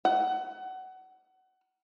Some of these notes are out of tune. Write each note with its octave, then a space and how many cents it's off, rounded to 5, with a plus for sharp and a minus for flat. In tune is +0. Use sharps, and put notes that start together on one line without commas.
F#5 +25